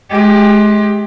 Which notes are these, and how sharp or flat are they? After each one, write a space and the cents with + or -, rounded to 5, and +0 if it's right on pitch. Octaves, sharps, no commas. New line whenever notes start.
G#3 +30 G4 +20